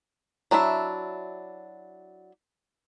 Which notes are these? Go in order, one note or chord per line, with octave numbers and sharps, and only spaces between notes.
F#3 D4 E4 E5